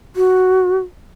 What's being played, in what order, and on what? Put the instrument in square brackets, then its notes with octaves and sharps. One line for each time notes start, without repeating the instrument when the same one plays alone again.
[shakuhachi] F#4